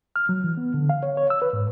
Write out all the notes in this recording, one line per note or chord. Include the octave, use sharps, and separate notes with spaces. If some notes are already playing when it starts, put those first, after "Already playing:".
F6
F#3
E3
B3
D3
F5
C#5
C#5
E6
B4
G#2